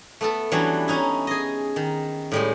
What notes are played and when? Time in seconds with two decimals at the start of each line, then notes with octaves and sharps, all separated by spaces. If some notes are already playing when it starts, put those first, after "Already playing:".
0.21 A3 B3 A4
0.52 E3 F#3 G3 B3 C#4 D4
0.88 C#4 D#4 E4
1.27 G#4 D#5
1.76 D#3
2.32 A2 G3 G#3